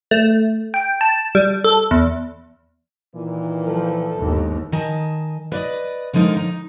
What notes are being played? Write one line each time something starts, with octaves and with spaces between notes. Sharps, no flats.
A3
G5
A5
G3
A4
E2
A#2 D#3 E3
F3 A4
G1 D#2 G#2
D#3 D#5 G#5 A5
B4 D5 D#5
D3 F3 G#3 D#4 A#4
D#4